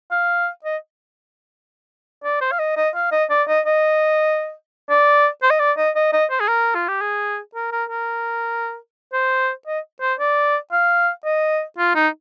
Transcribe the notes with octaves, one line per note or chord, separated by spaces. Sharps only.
F5
D#5
D5
C5
F5
D#5
D#5
F5
D#5
D5
D#5
D#5
D5
C5
D#5
D5
D#5
D#5
D#5
C5
G#4
A#4
F4
G4
G#4
A#4
A#4
A#4
C5
D#5
C5
D5
F5
D#5
F4
D#4